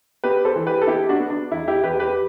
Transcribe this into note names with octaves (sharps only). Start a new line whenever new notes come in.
B3 G4 B4
A4 C5
E3
G4 B4
A4
B3 E4 G4
D4 F#4
B3
D4
E2 E4
E4 G4
E2 G4 B4
G4 B4